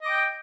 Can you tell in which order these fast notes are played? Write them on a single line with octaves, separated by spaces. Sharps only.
D#5 D6 G5